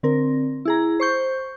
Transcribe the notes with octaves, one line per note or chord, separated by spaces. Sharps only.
D3 C4 A#4
E4 G#4 A#5
C5 C#6 G6